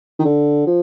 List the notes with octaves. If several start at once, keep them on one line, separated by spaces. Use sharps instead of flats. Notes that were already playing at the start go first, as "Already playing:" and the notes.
D#3
D3
F3